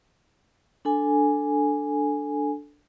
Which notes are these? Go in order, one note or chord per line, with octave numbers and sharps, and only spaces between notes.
D4 A4 G#5